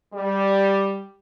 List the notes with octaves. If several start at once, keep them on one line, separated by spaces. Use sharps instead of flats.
G3